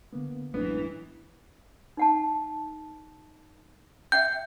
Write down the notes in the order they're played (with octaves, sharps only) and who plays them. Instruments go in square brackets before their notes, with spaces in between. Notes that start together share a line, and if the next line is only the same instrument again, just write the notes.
[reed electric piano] D3 A#3 B3
[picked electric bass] A1 D4 [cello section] F#2 E3 [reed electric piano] G#3 [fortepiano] B3
[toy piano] D#4 F#5 A5
[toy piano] E5 F#5 G5 [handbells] G6